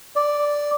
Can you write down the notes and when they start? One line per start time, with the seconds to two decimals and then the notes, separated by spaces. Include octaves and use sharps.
0.16 D5